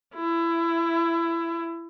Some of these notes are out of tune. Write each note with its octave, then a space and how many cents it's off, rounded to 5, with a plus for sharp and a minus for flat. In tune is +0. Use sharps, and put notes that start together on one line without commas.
E4 +25